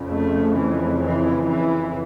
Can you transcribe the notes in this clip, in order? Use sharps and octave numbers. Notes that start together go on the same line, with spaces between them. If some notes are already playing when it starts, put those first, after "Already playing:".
Already playing: F2 C#3
A3
E3
E3
E3